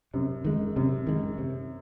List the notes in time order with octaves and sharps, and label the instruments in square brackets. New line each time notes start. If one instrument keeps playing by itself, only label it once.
[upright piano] F#2 [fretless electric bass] C3
[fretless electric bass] D#3 G#3
[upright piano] F#2 [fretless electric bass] C3
[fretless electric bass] D#3 G#3
C3